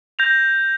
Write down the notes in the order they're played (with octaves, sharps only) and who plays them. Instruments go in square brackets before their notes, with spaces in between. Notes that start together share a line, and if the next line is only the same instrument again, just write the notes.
[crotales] G6 A#6 F7